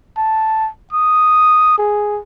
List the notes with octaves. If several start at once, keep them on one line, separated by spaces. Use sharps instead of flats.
A5
D#6
G#4